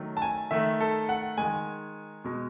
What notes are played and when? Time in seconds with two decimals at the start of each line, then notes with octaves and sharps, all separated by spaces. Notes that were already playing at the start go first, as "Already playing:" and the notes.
Already playing: D#3 F#3 A3
0.17 A5
0.22 G#5
0.51 D#3 A3 E5
0.80 A4
1.09 F#5
1.38 D#3 G#3 G#5
2.24 B2 G#3